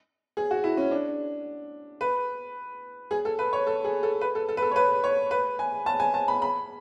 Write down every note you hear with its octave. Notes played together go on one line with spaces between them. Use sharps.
G#4
F#4
E4
C#4
D4
B4
G#4
A4
B4
C#5
A4
G#4
A4
B4
A4
A4
B4
A4
C#5
B4
C#5
B4
G#5
A5
G#5
A5
B5
B5